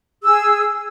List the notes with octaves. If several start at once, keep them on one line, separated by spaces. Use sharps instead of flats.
G#4 E6